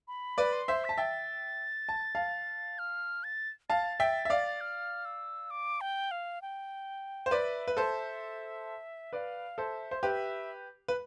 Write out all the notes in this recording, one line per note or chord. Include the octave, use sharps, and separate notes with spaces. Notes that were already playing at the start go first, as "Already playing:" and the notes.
B5
B4 D5
C6
C5 E5
A5 B6
E5 G5 A6
A5
F5 A5
F6
A6
F5 A5 A6
E5 G5
E5
D5 F5
F6
E6
D6
G5
F5
G5
C5
B4 D5 E5
B4
A4 C5
B4 D5 F5
A4 C5 E5
C5
G4 B4 E5
B4